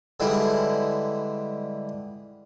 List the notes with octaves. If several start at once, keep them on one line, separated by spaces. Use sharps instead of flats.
D3 E3 G3 G#3